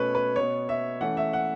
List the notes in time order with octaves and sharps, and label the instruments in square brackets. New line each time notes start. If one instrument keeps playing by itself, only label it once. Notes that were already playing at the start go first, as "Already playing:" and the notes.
Already playing: [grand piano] B2 A3 C#4 B4 C#5
B4
B2 B3 C#5
E5
E3 A3 C#4 F#5
E5
F#5